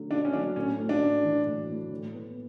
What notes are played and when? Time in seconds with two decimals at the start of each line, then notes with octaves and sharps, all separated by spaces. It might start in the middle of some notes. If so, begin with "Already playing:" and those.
Already playing: D2 D3 F#3 A3
0.11 D2 D4
0.25 C#4
0.33 F#3 D4
0.56 A2 C#4
0.78 A3
0.89 D4
1.00 A2
1.23 E3
1.47 A2
1.68 A3
1.92 A2
2.14 B3